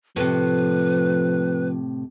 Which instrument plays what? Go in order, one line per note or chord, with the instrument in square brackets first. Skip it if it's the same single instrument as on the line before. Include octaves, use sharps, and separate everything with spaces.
[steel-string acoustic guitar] A2 C3 [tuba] F3 [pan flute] B4